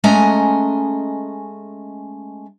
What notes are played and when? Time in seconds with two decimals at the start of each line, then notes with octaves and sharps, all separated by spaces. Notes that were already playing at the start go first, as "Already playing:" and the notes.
0.04 G#3 A3 C#4 D#5 G#5 A#5